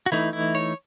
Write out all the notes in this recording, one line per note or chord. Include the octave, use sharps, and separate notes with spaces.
F#4
E3 A3 D#4 E4
E4
C#5